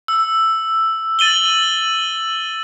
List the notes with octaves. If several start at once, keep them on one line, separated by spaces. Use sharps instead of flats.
E6
A6 D#7 F#7 G7